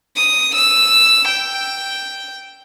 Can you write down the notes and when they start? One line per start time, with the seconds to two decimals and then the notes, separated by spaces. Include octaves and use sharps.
0.17 D#6
0.56 E6
1.28 G5